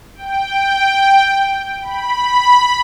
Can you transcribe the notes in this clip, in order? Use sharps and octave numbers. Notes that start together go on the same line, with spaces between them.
G5
B5